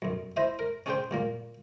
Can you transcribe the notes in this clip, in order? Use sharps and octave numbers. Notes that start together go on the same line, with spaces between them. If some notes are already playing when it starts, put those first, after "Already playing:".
B1 F#2
E4 C5 D#5 E5
A#4
C#4 D4 G#4 B4 C5 G5
G2 A#2 A#3